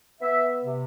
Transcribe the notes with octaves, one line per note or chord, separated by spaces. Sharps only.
B3 E5
C3